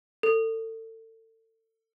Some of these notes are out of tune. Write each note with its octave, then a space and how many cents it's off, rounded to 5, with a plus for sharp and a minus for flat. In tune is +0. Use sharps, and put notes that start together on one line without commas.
A4 +30